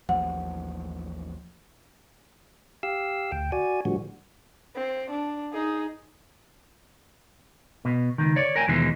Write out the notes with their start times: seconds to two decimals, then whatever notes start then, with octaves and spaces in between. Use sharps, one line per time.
0.09 A1 D#2 F3 F#5
2.83 G4 F5 E6
3.32 D2 G5
3.52 F#4 D5 G#5
3.85 A2 D3 F3 G3 F#4
4.76 C4
5.11 D4
5.53 D#4 G#4
7.85 B2
8.18 C#2 D#3
8.36 C#5 D5
8.56 A#4 G5 G#5
8.68 D#2 B2 E3 F3 G#3